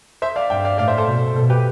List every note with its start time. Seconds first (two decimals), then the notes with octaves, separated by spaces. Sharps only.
0.22 C5 E5
0.36 D5 F5
0.50 G2 E5 G5
0.65 D5 F5
0.78 A2 D5 F5
0.88 C5 E5
0.98 A4 C5
1.07 B2
1.36 B2 A4
1.50 G4 B4